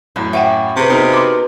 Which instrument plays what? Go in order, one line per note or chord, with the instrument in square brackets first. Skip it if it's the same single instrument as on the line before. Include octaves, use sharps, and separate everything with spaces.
[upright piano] F#2 A2 [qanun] F5
[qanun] C#4 D6 [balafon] E5 F#5 G5
[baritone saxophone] C3 [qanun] G#4 B4
[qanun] B2 E4 [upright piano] D#4 A#4
[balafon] C6 D6